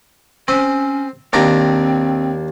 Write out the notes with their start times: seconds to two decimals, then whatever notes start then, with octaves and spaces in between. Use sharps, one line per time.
0.48 C4 C#4
1.33 D#2 C4 D4 A#5